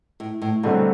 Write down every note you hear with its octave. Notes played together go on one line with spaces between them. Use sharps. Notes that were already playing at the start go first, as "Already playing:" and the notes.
A2
A2
G2 B2 D3 F#3 A3 C4